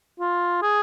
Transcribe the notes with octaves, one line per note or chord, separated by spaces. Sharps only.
F4
G#4